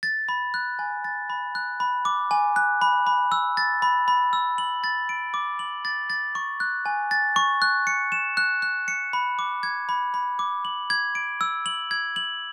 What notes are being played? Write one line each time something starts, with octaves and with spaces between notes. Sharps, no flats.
A6
B5
F#6
G#5
A6
B5
F#6
B5
D6
G#5
F#6
B5
B5
E6
A6
B5
B5
E6
F#7
A6
D7
D6
F#7
A6
A6
C#6
F#6
G#5
A6
C#6
F#6
C#7
E7
F#6
F#6
C#7
B5
D6
G#6
B5
B5
D6
F#7
G#6
D7
E6
F#7
G#6
F#7